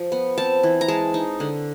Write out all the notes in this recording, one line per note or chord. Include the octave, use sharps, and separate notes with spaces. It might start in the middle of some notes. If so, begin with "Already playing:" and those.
Already playing: F3
B3
C4 A5
E3
A#5
G#3 A5
D#4
D3